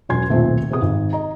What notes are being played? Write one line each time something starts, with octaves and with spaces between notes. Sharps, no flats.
E1 F#3 C#4 G#5 C6 G#6
D#1 B1 A#2 A3 C4 E5
C3 B3 G#4 D#6
G#1
D#5 A#5